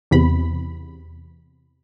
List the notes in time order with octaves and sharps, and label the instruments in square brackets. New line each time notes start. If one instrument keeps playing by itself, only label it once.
[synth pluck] E2 C3 B5